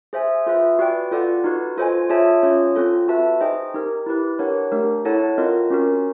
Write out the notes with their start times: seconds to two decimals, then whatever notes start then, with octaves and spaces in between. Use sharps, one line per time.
0.13 G#4 C5 E5 G#5
0.47 F4 G#4 B4 E5
0.79 F#4 B4 D5 G5
1.12 F4 A4 D5 F#5
1.44 D#4 F#4 B4
1.77 F4 A4 C5 D#5 G#5
2.09 F4 G#4 C#5 E5 A5
2.43 C#4 F4 G#4 C#5
2.75 C4 F4 A4
3.08 F#4 B4 E5 A5
3.41 D#4 G#4 C5 D#5 G5
3.74 D#4 G4 A#4
4.06 E4 G4 B4
4.39 D4 G4 A#4 C#5 F#5
4.72 A3 D4 G4 A#4
5.05 E4 A4 C#5 F#5 A5
5.38 C4 F4 A#4 D#5
5.70 C#4 F#4 A#4